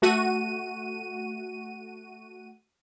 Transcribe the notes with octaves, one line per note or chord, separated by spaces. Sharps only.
A3 F#4 D#7